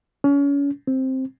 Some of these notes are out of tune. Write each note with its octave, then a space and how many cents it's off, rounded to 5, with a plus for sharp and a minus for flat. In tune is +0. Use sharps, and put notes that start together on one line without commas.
C#4 +30
C4 +5